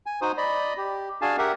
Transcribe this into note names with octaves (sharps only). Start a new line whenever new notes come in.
G#5
D#4 F#4 C5 D#6
D5 D#5 B5
G4
D4 F#4 G#4 F5 G#5 A5
G4 A#4 E5 F#5